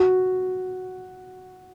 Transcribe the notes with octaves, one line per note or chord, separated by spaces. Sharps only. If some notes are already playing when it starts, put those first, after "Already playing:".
Already playing: F#4